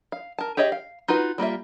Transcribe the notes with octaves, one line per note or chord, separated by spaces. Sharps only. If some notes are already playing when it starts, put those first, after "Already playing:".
F5
A#4 A5
G4 G#4 C#5 D#5 E5
F5
D#4 F4 F#4 B4
G3 A#3 F4 E5